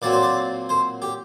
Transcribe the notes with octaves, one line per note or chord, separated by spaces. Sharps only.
A#2 F#3 C4 D5
C5
D5
C5
G4